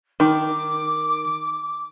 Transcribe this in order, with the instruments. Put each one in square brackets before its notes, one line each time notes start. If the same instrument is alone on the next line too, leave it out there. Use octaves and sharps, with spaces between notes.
[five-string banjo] D#3 [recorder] D6